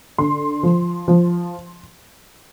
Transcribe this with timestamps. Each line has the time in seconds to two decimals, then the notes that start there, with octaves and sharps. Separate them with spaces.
0.18 D3 C6
0.63 F3
1.08 F3